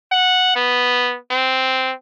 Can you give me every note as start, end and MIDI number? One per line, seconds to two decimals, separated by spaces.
0.12 0.52 78
0.56 1.17 59
1.31 1.93 60